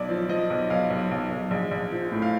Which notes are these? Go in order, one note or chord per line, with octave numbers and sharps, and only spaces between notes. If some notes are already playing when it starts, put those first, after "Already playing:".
Already playing: B1 D5
F3
F3 D#5
B1
B1 F5
B1
B1
B1
A#1
A#1
F3
A2
F5